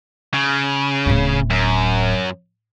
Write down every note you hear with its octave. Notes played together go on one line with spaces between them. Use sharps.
C#3
D1 A2
F#2